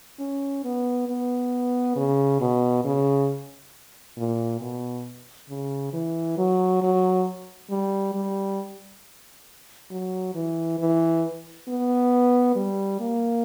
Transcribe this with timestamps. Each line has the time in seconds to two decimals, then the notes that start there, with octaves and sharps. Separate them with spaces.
0.20 C#4
0.64 B3
1.08 B3
1.96 C#3
2.41 B2
2.84 C#3
4.17 A#2
4.61 B2
5.49 C#3
5.93 E3
6.38 F#3
6.82 F#3
7.70 G3
8.14 G3
9.91 F#3
10.35 E3
10.79 E3
11.68 B3
12.56 G3
13.00 A#3